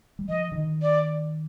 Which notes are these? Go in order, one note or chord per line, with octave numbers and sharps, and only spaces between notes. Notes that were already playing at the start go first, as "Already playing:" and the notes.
G3
F3 D#5
D3
D#3
D5